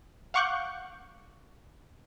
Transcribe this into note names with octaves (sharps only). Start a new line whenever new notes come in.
F5 F#5 C#6 D6 F#6 G6